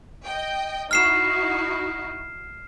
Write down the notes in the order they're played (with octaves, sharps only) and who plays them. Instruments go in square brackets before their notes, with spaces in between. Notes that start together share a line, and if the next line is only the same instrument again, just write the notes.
[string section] D#5 G5
[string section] D#4 E4 F#4 [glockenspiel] F6 C7 E7